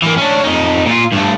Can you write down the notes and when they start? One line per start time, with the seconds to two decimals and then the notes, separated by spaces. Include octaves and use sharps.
0.02 E3 A#3
0.17 C#4 D4
0.44 F2 D#4
0.86 A#2 F4
1.12 G2 A3